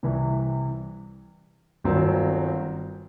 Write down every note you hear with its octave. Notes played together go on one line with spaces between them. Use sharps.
C2 C3 E3
G1 G2 D#3 F#3 C4